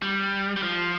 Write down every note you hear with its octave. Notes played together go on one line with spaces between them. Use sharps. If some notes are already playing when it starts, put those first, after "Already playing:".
G3
G3
F3